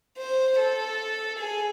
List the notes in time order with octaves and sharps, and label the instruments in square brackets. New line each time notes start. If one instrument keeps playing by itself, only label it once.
[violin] C5
A4
G#4